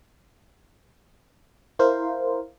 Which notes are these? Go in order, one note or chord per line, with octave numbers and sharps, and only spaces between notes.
E4 A#4 C5 F5